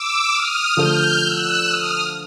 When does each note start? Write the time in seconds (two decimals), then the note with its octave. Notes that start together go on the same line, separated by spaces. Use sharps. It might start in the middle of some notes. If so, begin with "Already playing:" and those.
Already playing: D6 E6
0.32 D#6 F6
0.77 D3 F3 A3 F6 G6
1.22 E6 F#6
1.68 D#6 F6